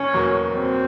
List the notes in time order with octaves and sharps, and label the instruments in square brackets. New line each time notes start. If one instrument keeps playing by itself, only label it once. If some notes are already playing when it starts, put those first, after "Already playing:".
Already playing: [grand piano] F#1 [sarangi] C#4
[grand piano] E2 B2 F#3 A#3
[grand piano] F#1 [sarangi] C4